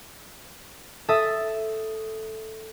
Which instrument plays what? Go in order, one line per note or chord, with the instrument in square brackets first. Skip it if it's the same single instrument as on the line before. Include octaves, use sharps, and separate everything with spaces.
[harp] A4 E5 D#6